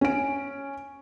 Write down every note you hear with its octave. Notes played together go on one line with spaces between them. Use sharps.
C#4 D7